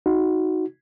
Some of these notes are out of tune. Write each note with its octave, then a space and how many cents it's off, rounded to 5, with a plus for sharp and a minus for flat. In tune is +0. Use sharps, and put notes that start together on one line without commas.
D#4 +15 F#4 +0